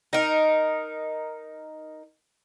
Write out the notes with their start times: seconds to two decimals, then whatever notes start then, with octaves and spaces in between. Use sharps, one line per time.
0.13 D#4 A#4